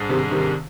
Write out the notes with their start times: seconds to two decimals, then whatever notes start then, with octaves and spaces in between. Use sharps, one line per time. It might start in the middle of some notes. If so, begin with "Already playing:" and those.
Already playing: G#2 G3 D4 G#4
0.09 C3 D#3
0.31 C3 D#3